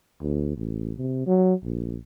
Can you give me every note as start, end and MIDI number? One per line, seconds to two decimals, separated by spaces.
0.21 0.53 38
0.57 0.92 33
0.97 1.25 48
1.27 1.54 54
1.64 1.97 34